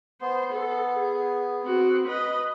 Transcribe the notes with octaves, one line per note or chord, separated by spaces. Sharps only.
B3 C5
A4
G#4
C4 F#4
B4 D#5